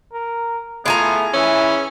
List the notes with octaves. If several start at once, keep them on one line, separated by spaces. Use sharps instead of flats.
A#4
A3 B3 E4 F4 G#4 A#5
E3 C#4 E5